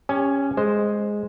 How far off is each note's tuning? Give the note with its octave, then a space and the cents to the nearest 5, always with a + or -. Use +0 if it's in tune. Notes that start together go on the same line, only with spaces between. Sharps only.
C#4 +0 G4 +30 G#5 +25
G#3 +0 C5 +0